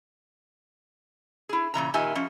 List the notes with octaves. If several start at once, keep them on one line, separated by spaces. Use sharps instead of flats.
E4 G#4
A#2 C#3 E3 A#5
A#2 D#3 G4 E5 G#5
F3 C#4